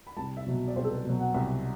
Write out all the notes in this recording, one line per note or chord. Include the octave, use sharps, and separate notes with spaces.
B5
C2 A5
E5
B2 F#3
D5
C2 C5
A4
B4
B2 F#3
F#5
C2 E5